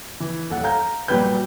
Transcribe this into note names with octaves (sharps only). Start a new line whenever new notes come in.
E3
D#1 A4 F#5
F5 A#5 G6
A#2 F#3 G3 G4 B4 G6